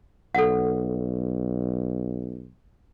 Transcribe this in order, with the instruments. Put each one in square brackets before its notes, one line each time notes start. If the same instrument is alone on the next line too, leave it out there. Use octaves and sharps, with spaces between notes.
[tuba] B1 [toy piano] A4 F#5